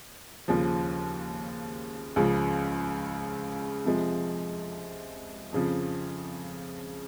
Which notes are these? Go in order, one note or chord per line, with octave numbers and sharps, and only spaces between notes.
D#2 C#3 F3
C#2 C#3 F3
F2 C3 F3 G#3
F2 C#3 F3